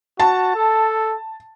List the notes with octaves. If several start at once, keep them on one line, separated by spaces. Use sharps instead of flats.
F#4 A5
A4